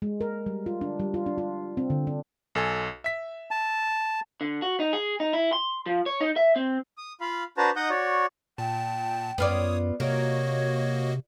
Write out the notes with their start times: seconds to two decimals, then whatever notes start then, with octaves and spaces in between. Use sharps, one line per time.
0.02 G#3
0.21 A#4
0.46 G3
0.66 F4
0.81 D4
0.99 G3
1.14 F4
1.26 D4
1.38 F4
1.77 C4
1.90 D3
2.07 D4
2.55 B1 A4 G#5
3.04 E5 B6
3.51 A5
4.41 D3
4.62 F#4
4.80 D#4
4.93 G#4
5.20 D#4
5.33 E4
5.53 C6
5.86 F3
6.06 C#5
6.21 D#4
6.36 E5
6.56 C4
6.98 D#6
7.21 F4 F5 B5
7.58 D4 F#4 B4 C5 A5 A#5
7.76 D#4 D#5 F#5 D#6 G6
7.90 F#4 C#5 D5
8.58 A#2 G5 A5
9.38 F#2 B3 F4 C#5 D5 D#6
10.00 C3 A#3 F#4 A#4 C#5 D#5